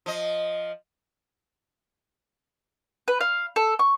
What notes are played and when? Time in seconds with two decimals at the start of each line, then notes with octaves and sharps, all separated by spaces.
0.06 F3 D#5
3.08 B4
3.21 F5
3.56 A4
3.79 C#6